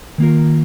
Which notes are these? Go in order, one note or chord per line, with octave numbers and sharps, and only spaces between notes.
D#3 A#3 F4 A#4